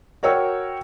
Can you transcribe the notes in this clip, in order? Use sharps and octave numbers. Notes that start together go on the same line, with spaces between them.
F#4 A#4 C#5 G5 E6